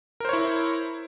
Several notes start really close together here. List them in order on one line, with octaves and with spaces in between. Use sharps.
A#4 C5 C#5 E4